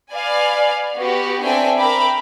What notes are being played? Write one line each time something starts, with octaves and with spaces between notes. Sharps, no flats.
B4 D5 F5 G#5
B3 F#4 G4
C4 D4 A4 E5 G5 G#5
A#4 E5 G5 B5 D6